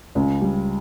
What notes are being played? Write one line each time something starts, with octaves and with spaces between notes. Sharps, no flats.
C#2
G3